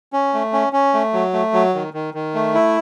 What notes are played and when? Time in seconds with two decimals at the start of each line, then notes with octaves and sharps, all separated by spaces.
0.13 C#4
0.34 A3
0.53 C#4
0.73 C#4
0.94 A3
1.13 F#3
1.34 A3
1.54 F#3
1.74 D#3
1.94 D#3
2.14 D#3
2.35 A3
2.55 E4